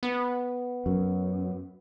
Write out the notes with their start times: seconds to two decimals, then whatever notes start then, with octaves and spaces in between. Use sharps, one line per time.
0.03 B3
0.86 F#2